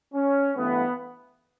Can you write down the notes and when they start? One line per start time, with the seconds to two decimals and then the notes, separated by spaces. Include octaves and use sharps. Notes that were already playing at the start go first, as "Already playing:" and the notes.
0.14 C#4
0.55 G2 E3 A3 B3